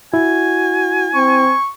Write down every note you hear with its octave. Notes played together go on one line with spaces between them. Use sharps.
E4 F#4 G#5
C4 C#6